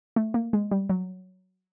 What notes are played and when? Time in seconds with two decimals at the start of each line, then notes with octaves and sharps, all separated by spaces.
0.16 A3
0.34 A#3
0.53 G#3
0.71 G3
0.89 F#3